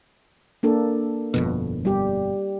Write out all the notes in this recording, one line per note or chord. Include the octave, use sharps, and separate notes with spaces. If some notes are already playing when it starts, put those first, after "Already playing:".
A#3 D4 A4
G1 F2 B2
G3 G4